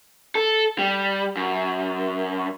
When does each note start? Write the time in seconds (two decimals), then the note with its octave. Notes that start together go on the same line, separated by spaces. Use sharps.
0.35 A4
0.79 G3
1.37 F#2